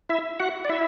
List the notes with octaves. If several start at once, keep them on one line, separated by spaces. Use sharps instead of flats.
E4 E5
F#4 F#5
D5
E4 E5